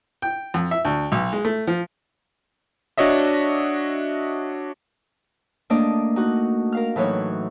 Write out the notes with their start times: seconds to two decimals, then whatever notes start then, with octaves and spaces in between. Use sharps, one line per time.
0.22 G5
0.54 F2
0.71 E5
0.85 D2
1.12 B1
1.33 G#3
1.45 A3
1.67 F3
2.98 D4 F#4 C#5 D#5 E5
5.70 A3 A#3 D4 D5 D#5
6.16 D#4 F#4
6.72 A#4 F5 F6
6.96 A2 E3 F#3 D#4 C#5